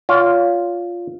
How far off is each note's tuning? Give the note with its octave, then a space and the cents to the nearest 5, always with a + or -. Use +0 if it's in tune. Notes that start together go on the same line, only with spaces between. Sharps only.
F4 +0 C#5 +35